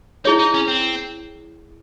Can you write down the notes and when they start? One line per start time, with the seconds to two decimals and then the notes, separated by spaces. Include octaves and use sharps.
0.25 D#4 E4 G#4 C#5
0.39 D#4
0.54 C#4
0.68 C4